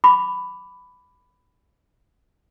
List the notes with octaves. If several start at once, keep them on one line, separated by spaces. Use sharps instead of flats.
B5 D6